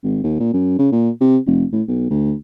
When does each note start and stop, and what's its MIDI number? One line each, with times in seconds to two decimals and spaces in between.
0.04 0.20 32
0.24 0.37 39
0.40 0.53 46
0.53 0.75 42
0.79 0.88 49
0.92 1.10 46
1.20 1.38 48
1.47 1.64 29
1.72 1.82 45
1.88 2.06 35
2.10 2.33 38